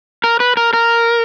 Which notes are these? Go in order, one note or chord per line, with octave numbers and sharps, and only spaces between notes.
A#4
B4
A#4
A#4